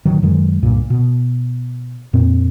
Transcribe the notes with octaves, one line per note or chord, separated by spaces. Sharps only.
A1 D#3 F#3
F#2 D#3 F#3 G#3
C2 G2 A#2
B2
F2 A#2 C4